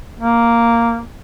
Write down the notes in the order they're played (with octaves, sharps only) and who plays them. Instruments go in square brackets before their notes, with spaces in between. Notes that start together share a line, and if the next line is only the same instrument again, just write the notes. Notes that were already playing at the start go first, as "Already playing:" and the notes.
[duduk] A#3